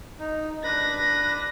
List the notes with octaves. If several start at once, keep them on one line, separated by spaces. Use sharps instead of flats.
D#4
D4 B4 B5 A#6